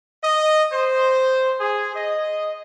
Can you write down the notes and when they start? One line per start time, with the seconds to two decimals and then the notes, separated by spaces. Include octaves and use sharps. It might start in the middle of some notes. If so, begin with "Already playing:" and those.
0.24 D#5
0.72 C5
1.60 G#4
1.96 D#5